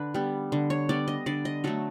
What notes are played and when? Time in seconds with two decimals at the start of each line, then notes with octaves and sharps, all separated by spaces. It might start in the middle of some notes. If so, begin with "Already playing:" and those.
Already playing: D3 B4
0.14 G3 B3
0.52 D3
0.70 C#5
0.89 G3 B3 D5
1.08 D#5
1.26 D3 D5
1.45 D#5
1.64 F#3 A3 A4